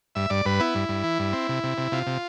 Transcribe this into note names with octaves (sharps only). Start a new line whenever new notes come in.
G2 E5
G2 D5
G2 B4
B3 E4
G2
G2
E3
G2
C4
C3
C3
C3
C3 F4
C3